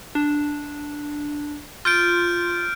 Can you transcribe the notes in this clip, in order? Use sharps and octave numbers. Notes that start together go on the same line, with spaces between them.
D4
F4 F6 G6 D7